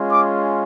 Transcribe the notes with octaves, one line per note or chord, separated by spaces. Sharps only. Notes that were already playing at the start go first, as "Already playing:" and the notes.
Already playing: G#3 C#4 F4
D6